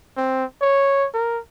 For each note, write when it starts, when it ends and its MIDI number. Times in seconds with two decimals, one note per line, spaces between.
0.17 0.44 60
0.61 1.07 73
1.14 1.39 70